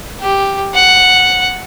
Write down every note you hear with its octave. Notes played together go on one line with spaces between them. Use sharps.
G4
F#5